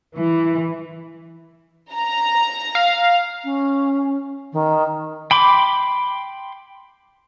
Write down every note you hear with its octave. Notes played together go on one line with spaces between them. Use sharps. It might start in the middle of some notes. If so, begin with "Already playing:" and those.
E3
A#5
F5
C#4
D#3
G5 B5 C6 D6